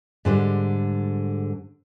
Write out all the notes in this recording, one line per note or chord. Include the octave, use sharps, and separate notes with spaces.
G#2 D3 G3